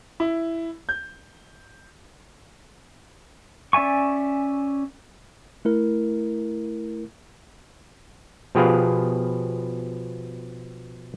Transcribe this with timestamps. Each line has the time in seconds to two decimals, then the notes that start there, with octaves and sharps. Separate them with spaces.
0.20 E4
0.89 G6
3.73 C#4 D5 E5 G#5 C#6
5.65 A3 E4 A#4
8.55 B2 F3 G4 G#4 B4 F5